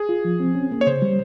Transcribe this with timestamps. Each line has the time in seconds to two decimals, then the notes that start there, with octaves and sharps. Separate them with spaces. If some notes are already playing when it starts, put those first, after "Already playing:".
Already playing: G#4
0.09 F4
0.25 F3
0.40 C4
0.55 C#4
0.71 A#3
0.81 C#5
0.87 C#3 C5
1.02 G3